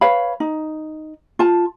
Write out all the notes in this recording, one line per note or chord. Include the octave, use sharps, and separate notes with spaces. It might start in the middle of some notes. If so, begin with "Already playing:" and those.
B4 C#5 F5 B5
D#4
F4 A5